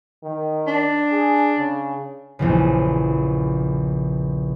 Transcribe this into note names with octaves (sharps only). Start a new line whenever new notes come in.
D#3
D4
G#4
C#3
A#1 E2 C#3